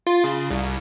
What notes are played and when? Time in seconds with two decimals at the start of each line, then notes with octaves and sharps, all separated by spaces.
0.07 F4
0.24 C#3
0.51 C2